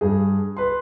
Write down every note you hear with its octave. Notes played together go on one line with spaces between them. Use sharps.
G2 G#4
B4 C6